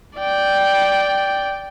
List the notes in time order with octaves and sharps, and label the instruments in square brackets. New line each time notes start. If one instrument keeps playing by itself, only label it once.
[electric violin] D5 G5